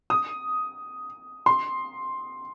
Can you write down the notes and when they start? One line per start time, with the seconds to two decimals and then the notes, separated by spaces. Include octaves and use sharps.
0.10 D#6
1.46 C6